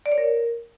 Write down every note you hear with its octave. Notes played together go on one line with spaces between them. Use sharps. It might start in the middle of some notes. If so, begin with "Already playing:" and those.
D5
C#5
A#4